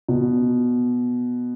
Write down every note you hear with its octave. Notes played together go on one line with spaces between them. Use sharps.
B2